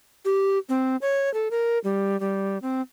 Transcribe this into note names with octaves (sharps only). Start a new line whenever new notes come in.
G4
C4
C#5
A4
A#4
G3
G3
C4